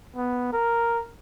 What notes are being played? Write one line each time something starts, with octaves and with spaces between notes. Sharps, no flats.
B3
A#4